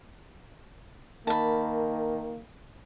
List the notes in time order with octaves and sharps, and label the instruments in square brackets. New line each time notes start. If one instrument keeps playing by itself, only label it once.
[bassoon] D#3 [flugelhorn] A#3 [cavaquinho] A5 B5